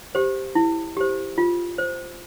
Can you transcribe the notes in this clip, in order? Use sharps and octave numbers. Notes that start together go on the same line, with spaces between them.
G4 C5
E4
G4 C5
F4
C5